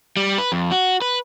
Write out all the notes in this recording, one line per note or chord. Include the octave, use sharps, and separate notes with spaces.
G3
B4
F2
F#4
B4